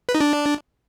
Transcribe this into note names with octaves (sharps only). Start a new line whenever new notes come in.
B4
D#4
D4